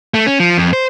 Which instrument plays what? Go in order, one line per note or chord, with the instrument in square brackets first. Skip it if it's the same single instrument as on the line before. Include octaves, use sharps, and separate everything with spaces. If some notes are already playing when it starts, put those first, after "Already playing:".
[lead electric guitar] A3
C#4
F3
F2
C5